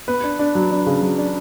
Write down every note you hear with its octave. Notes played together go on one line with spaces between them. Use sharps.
B3 B4
D4
D4
F#3
D4
C#3
F#3
D4